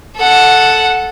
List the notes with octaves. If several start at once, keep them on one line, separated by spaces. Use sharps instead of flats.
A4 F#5